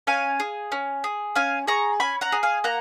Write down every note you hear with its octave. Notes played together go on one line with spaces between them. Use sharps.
C#4 F5 G#5
G#4
C#4
G#4
C#4 F5 G#5
G#4 A#5 C#6
C#4 G#5 B5
F#5 A#5
G#4
F5 G#5
A#3 F#5 A#5